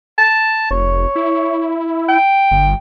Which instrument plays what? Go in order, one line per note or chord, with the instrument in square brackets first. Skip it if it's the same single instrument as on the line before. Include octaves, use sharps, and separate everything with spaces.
[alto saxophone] A5
[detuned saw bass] F1 [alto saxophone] C#5
[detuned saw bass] E4
[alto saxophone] G5
[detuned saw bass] G1